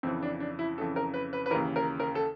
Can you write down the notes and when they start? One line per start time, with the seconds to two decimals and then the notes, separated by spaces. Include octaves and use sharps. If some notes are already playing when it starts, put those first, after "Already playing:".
0.03 F2 C#3 E3 C4
0.22 D4
0.40 D4
0.59 E4
0.78 F2 C#3 E3 A4
0.96 A#4
1.14 B4
1.33 B4
1.46 B4
1.50 E3 A#4
1.53 D#2 C#3
1.76 A#4
2.00 A#4
2.15 A4